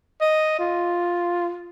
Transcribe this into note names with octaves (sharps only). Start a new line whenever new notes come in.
D#5
F4